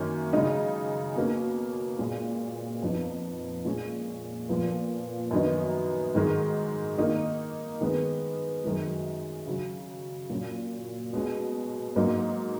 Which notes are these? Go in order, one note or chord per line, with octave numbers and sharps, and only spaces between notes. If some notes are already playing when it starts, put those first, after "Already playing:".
Already playing: F#2 D#3 A#3 C#4
C#3 G#3 D#4
B2 A#3 C#4
A#2 G#3 C#4
F2 F3 B3 D#4
A#2 G#3 C#4
A#2 F3 B3
F#2 D#3 F#3 B3 D#4
G#2 D#3 G#3
D#3 A#3 D#4
D#3 G#3 B3
F#2 D#3 G#3
C#3 F#3 C#4
A#2 F#3 C#4
B2 G#3 C#4
G#2 F#3 A#3 D#4